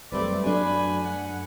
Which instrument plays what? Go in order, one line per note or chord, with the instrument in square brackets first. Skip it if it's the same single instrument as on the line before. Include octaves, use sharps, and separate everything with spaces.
[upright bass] F#2 [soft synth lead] G3 [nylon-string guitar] A3 C4 B4 [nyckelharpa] D5
[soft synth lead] F#3 [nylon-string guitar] A3 D4 F#4 [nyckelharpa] G#5 B5
[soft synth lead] F#5